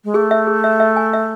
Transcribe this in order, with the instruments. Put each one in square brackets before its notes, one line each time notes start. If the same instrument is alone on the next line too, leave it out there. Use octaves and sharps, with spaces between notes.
[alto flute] G#3
[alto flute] A3 [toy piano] G#4
[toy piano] E5
G#4
E5
E5
G#5
E5